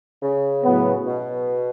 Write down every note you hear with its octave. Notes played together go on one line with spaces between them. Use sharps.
C#3
A2 F#3 B3
B2